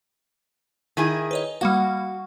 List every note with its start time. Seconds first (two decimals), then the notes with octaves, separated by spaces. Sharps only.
0.97 D#3 E4 G#4
1.31 B4 C#5 D#5
1.61 G3 A#3 F#4 F5